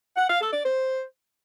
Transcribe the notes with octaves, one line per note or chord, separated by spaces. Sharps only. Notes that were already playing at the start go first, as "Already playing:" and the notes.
F#5
F5
A4
D5
C5